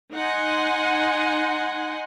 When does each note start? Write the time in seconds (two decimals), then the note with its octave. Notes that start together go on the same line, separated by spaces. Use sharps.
0.15 D#4 F#5 G#5 C6